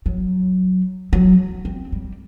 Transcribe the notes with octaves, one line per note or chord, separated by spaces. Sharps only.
F#3
F#3
C4
G3